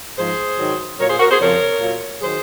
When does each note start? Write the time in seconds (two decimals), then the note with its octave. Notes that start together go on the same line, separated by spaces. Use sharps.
0.18 G#2 F3 G#4 C5
0.59 G#2 D#3 F#3
0.99 A#2 F#3 A#4 C#5
1.09 G#4 C5
1.19 F#4 A#4
1.30 G#4 C5
1.40 F2 C#3 F3 A#4 C#5
1.80 A#2 F#3
2.21 D#3 F#3 G#4 C5